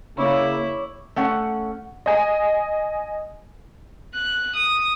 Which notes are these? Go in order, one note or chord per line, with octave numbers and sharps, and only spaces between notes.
C#3 A#3 E4 C#5 D5
A3 C#4 F#5
D#5 G#5
F#6
D#6